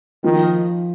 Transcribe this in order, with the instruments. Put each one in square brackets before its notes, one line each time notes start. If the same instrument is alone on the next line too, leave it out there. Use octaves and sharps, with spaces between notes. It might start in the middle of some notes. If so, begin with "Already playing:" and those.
[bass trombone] D#3 [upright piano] F3